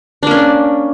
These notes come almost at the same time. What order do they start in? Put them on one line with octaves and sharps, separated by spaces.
D4 A#3 C#4